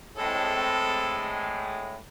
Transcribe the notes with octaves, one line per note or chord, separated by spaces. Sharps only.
A2 G#3 C4 A4